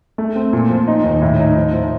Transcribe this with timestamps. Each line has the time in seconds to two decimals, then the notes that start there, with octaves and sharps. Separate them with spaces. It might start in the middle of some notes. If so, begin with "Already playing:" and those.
0.18 A3
0.36 C4
0.53 A#2
0.70 F3
0.88 D#4
1.04 D#2
1.22 A2
1.39 D#4
1.56 F3
1.73 F3